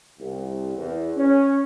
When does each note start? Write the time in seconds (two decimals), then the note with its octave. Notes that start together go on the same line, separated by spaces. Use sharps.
0.19 C2
0.77 E2
1.16 C#4